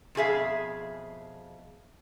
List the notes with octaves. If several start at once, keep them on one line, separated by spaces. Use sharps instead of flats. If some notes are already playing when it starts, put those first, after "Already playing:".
F2 B2 G#4 E5 F5